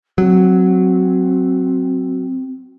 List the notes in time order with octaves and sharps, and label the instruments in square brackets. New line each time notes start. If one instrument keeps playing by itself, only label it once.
[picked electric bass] F#3 [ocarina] C4